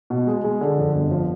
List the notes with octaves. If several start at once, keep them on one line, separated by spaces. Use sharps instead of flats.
B2
G#3
G#3
D3
F2
G1
F3